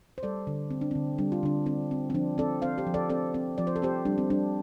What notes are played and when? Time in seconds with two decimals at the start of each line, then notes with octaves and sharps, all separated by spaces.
0.18 C5
0.23 G3 A4 D5
0.47 D3
0.71 C4
0.81 D4
0.91 D3 C4
1.18 G3 D4
1.32 F4
1.43 D3 D4
1.66 C4 D4
1.91 C4
2.10 C4
2.14 F3 D4
2.38 C4 A4 D5
2.62 C4 C5 F5
2.78 G4 C5
2.87 F3
2.94 A4 D5
3.10 C4 A4 D5
3.34 C4
3.58 F3 D5
3.67 C5
3.76 A4
3.82 C4 G4 C5
4.05 G3 D4
4.18 C4
4.30 G3 D4